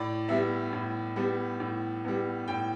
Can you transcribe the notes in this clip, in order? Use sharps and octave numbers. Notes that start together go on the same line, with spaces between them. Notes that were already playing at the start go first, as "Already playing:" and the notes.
Already playing: A2 D5
G3 B3 E5
A2
G3 B3
A2
G3 B3
A2 G5